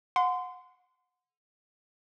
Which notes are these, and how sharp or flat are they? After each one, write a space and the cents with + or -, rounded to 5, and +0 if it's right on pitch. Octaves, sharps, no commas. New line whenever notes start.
F#5 -25 C6 -25